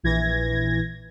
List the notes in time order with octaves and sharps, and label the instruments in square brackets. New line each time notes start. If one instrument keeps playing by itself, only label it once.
[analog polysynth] A#1 E3 G#6 A#6